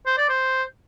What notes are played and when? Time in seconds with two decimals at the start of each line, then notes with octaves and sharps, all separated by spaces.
0.06 C5
0.18 D5
0.29 C5